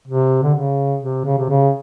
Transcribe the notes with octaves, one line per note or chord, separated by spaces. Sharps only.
C3
D3
C#3
C3
C#3
C3
C#3